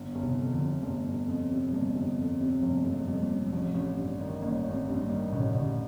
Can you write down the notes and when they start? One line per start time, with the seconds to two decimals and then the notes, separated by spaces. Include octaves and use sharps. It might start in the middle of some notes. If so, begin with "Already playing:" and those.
Already playing: G1
0.15 G1
0.23 C3 D#3
0.39 F2
0.53 D3 F3
0.60 C3
0.82 G1 A3 C4
1.06 G1
1.28 F2
1.51 C3
1.73 G1 G3 A#3
1.95 G1
2.18 F2
2.41 C3
2.62 G1 F3 A3
2.85 G1
2.92 A3 C4
3.00 F3
3.08 F2 G3
3.15 A3
3.22 G3 A#3
3.30 C3
3.46 G3
3.52 A1 F3 A3
3.74 A1
3.97 G2
4.21 D#3
4.42 A1 G3 A#3
4.64 A1
4.72 A3 C4
4.88 G2
4.94 C4
5.02 G3 A#3
5.09 D#3
5.32 A1 A2 C3
5.55 A1 A#2 D3